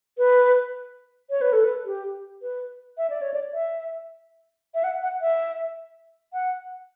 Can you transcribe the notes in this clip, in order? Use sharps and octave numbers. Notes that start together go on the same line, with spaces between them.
B4
C#5
B4
A4
B4
G4
B4
E5
D5
C#5
D5
E5
E5
F#5
F#5
E5
F#5